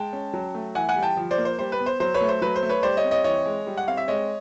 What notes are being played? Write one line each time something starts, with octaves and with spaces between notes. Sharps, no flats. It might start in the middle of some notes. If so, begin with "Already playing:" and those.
Already playing: G#3 G5 A5
C#4
F#3
A3
E3 F#5 G#5
F#5 G#5
G3
G5 A5
F3
C5 D5
A#3
C5
G3 C5
B4
B3
C5
F#3 C5
B4 C#5
A3
C5
F#3 B4
C5
A3
B4 C#5
G3 C5 D5
C#5 D#5
C4
C#5 D#5
E3 C#5 D#5
G#3
G3
F#5
C4 F5
E5
G#3 C#5 D#5